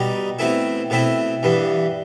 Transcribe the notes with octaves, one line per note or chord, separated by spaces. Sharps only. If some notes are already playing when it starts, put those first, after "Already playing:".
Already playing: B2 G3 D#4
B2 A3 C4 E4
B2 A3 C4 E4
G2 E3 B3